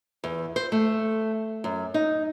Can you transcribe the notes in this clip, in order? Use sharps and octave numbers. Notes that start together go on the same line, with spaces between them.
E2
C5
A3
F#2
D#4